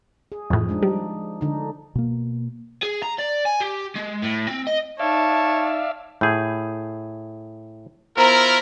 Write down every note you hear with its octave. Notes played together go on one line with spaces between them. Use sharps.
G#4
F2 A2 F3
G#3 D4 D#4
G3
D3 D4 D#4
B2 A#3
G#4
A#5
D5
G#5
G4
G#3
A2
C4
D#5
D#4 C#5 D5 E5 F5 A5
A2 G#4 G6
B3 E4 F4 A#4 C5 A#5